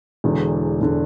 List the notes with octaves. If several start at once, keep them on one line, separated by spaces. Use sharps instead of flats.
E1 E2 D3
E1 D3